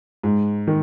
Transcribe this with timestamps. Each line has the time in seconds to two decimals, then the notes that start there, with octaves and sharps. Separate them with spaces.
0.23 G#2
0.67 D#3